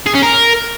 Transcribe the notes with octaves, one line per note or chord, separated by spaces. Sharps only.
G#4
C#4
A#4